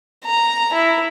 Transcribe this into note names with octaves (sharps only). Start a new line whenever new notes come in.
A#5
E4